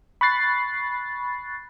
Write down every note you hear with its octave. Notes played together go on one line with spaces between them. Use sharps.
B5 C#6 F#6 A6 C7